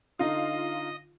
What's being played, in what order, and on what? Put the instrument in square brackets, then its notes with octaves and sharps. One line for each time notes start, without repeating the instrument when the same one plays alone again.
[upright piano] D3 D#4 [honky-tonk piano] F4 [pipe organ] D#5